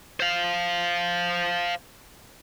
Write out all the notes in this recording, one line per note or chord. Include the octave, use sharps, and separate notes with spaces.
C5 F5